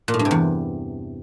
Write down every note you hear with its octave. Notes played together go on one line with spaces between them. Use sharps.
A#2
A2
G2
C3
E2